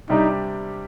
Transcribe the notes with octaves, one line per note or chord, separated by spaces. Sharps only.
C3 G3 D4 D#4 G4